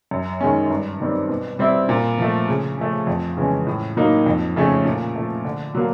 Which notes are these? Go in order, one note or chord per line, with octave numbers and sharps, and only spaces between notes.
F#2
D#3 G#3 C#4
G2
D#3 G3 C4
B2
G3 C4 E4
A#2
F3 A3
C#3
F3 A3
F2
C#3 E3 G#3 C#4
A2
F#3 A#3 D#4
F2
C#3 F3 A3 C#4
A#2
F3 A3
D3
F#3 A#3